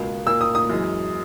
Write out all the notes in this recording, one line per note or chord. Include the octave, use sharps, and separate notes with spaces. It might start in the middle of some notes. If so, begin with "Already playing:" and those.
Already playing: C#2 B2 A#3
A#2 A#3 E6
D#6
D#6
F#2 E3 G#3